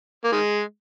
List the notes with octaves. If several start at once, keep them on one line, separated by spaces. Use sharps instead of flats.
A#3
D#3 G#3